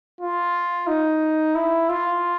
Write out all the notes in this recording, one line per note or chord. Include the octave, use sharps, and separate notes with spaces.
F4
D#4
E4
F4